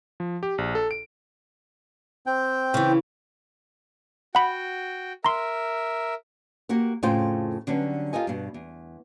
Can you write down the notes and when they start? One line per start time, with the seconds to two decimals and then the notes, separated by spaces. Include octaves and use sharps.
0.20 F3
0.43 G4
0.58 A#1
0.75 A4
0.91 D7
2.26 C4 G5
2.74 C#3 E3
4.35 F#4 F#5 G5 B5
5.24 A#4 E5 A#5 C6
6.69 A#3 F#4 G4 A#4
7.03 F2 A2 C#3 F4 C5 G5
7.67 D3 F#3 G3 B3 C#4 D4
8.13 F4 G4 A4 A#4 D#5 G#5
8.27 G2 B2
8.54 E2